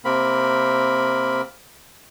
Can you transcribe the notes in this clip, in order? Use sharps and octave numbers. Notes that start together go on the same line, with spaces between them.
C3 A#3 C4 A#4 B5